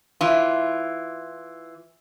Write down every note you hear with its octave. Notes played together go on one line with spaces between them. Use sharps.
E3 F4